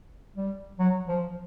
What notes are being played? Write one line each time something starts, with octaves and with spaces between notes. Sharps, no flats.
G3
F#3
F3